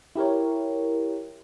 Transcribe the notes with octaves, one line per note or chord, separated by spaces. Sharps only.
E4 G4 A#4 C#5